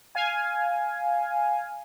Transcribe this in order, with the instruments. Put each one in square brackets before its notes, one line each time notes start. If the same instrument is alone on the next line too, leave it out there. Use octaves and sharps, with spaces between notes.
[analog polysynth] F5 G#5